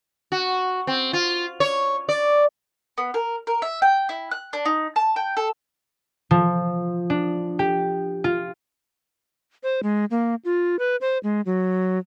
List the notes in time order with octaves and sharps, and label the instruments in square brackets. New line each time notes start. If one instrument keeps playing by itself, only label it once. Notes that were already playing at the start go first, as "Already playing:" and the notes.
[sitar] F#4
C4
F4
C#5
D5
[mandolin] B3
A#4
A#4
E5
G5
E4
F#6
D4
D#4
A5
G5
A4
[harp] F3
D4
G4
F4
[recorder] C5
G#3
A#3
F4
B4
C5
G#3
F#3